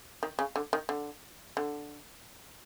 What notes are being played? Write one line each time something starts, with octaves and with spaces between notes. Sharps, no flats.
D#3
C#3
D3
D#3
D3
D3